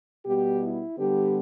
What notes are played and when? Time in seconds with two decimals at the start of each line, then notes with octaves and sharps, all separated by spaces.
0.24 B2 G3 B3 G4
0.61 E4
0.97 D3 G3 B3 G4